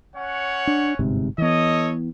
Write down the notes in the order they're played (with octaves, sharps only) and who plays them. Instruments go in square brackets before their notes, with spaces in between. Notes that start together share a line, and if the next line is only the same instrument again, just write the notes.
[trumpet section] C#4 C#5 F#5
[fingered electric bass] D4
G1 G#2 C3
[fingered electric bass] E3 B3 [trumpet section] A4 C#5 D#5